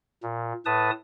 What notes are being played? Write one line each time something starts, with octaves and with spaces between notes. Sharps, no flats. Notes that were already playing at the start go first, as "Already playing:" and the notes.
A#2
A2 B4 A5 D#6